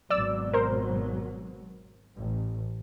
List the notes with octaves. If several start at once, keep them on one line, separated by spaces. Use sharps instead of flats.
G#1 B2 F#3 D5 E6
A#4 C5
A1